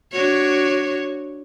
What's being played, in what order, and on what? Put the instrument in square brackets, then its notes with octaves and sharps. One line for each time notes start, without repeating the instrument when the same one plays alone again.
[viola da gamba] D4 F#4 C#5